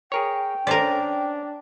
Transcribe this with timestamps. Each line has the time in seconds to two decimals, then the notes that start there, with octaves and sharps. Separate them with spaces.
0.12 G#4 A#4 C#5 G5
0.67 C#4 D4 A#4 C5 D5